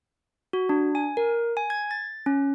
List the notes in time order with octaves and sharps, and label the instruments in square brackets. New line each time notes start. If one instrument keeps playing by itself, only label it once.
[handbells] F#4
D4
G#5
A#4
G#5
G#6
A6
C#4